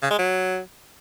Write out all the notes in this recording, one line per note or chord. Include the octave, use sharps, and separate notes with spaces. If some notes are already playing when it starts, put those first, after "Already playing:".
C#3
G#3
F#3